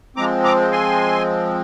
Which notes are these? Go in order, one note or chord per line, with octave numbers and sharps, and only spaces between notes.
F3 G#3 C4 A#5 D6
A#5 D6
G#5 C6